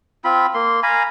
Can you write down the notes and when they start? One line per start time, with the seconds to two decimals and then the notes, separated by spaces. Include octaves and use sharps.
0.24 C4 F4 B5
0.54 A#3 C6
0.83 F5 G#5 A#5 B5